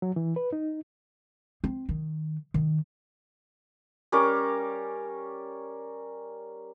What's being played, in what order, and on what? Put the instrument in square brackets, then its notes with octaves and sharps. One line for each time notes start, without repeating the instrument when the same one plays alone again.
[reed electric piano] F#3
E3
B4
D#4
[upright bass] C4
D#3
D#3
[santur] G3 C#4 A#4 D6